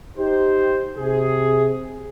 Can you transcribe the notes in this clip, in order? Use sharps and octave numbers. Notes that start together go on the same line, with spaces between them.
D#4 G4 C5
C3 G#4